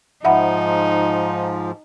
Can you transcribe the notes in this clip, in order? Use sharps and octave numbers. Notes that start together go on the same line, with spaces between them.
G#2 F3 D#4 E5 F#5 B5